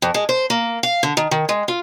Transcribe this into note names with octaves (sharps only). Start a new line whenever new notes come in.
F2
G#3
C5
A#3
F5
D3
D#3
D#3
G#3
F4